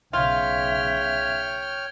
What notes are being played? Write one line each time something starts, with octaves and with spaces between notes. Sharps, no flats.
B1 C#3 F4 C#5 E5 G5 F6